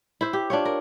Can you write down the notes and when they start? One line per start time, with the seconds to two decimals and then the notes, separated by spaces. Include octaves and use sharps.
0.21 E4 C5
0.33 G4
0.50 D4 F4 C#5
0.65 A#4